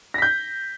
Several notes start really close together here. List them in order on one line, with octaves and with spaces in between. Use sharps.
A#6 B6 G6